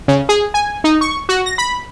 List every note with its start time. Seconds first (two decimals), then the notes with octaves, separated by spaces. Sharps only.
0.08 C#3
0.29 G#4
0.54 G#5
0.84 D#4
1.01 C#6
1.29 F#4
1.46 A#6
1.58 B5